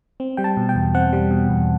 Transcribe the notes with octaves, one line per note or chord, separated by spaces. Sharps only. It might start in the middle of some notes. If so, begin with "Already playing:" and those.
C4
G3 G5
A5
B2
G5
E2
C4 F#5
G3
B2
E2